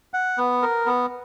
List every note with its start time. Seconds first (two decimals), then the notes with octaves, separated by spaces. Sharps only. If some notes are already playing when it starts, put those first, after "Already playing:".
0.14 F#5
0.38 B3
0.62 A#4
0.86 B3